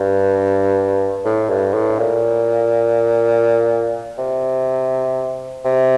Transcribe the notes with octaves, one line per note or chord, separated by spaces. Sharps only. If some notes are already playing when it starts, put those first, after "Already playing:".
Already playing: G2
A2
G2
A2
A#2
C3
C3